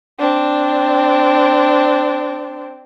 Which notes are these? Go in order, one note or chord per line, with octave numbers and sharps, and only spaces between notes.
C4 D4